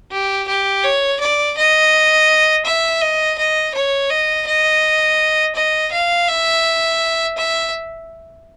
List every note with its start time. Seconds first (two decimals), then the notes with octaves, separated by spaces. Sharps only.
0.11 G4
0.48 G4
0.84 C#5
1.20 D5
1.57 D#5
2.65 E5
3.01 D#5
3.38 D#5
3.74 C#5
4.10 D#5
4.47 D#5
5.55 D#5
5.92 F5
6.28 E5
7.37 E5